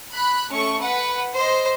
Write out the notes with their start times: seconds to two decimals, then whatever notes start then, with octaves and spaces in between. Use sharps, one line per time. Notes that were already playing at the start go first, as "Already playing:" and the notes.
0.13 B5 F#6
0.51 A3 C#4 C#6
0.80 B4 F#5
1.35 C5 D#5